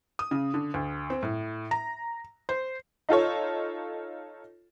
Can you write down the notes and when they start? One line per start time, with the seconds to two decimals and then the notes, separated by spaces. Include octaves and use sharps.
0.19 D#6
0.31 C#3
0.54 D3
0.74 D2
1.10 C4
1.23 A2
1.71 A#5
2.49 C5
3.09 D#4 F4 A4 C#5